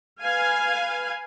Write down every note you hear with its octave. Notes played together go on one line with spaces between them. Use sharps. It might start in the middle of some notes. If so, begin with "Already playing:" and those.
B4 F5 G#5